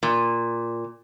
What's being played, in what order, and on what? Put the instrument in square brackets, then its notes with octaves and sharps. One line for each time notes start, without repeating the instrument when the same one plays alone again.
[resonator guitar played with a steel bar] A#2